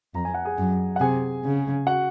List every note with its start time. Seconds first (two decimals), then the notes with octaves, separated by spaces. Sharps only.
0.14 F2 A#5
0.25 G#5
0.34 F#5
0.45 G#4 G#5
0.58 F#2
0.96 F#5
1.00 C3 G#4 G#5
1.44 C#3
1.87 F#4 F#5